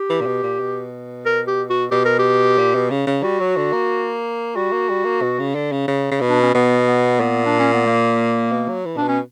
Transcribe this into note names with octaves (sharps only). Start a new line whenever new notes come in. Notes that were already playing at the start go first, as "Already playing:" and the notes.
Already playing: G4
E3
A#2
B2
A#2
B2
A#4
G4
F#4
B2 G4
A#4
G4
A#2
B2
C#3
C#3
G3 F#4
F#3
D3
A#3
G3 F#4
A#3
G3
A#3
B2
C#3
D3
C#3
C#3
C#3
B2
D4
C#4
B2 B3
B3
A#2
D4
C#4
B3
A#3
B2
F#3
E3
A#2 D4
B2
C#4